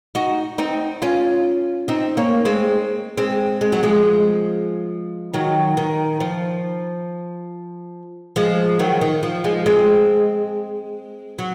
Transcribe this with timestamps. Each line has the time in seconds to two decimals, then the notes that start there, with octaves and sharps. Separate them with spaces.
0.15 D#4 F#4
0.58 C4 D#4
1.02 C#4 F4
1.88 C4 D#4
2.17 A#3 C#4
2.45 G#3 C4
3.18 G#3 C4
3.61 G#3
3.72 F#3
3.83 F3 G#3
5.34 D#3 F#3
5.77 D#3
6.20 F3
8.36 F3 G#3
8.79 D#3 F#3
9.01 D#3
9.23 F3
9.44 F3 G#3
9.66 G#3 C4
11.39 F#3